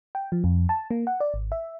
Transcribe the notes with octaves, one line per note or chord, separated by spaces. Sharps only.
G5
F3
F2
A5
A#3
F#5
D5
G#1
E5